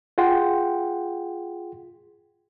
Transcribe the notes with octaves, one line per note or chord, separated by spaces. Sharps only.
F4 G#4 F#5 G5 C6